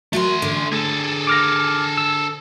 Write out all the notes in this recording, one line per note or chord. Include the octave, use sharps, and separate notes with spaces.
F#3 A3 F#4 A#4 C6
D3
G#4 A4
D6 F6 A#6
E6